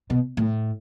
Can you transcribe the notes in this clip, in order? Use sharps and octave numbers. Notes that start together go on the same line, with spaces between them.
B2
A2